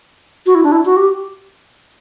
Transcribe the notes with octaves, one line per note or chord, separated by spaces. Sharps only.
F#4
E4
D4
E4
F#4
G4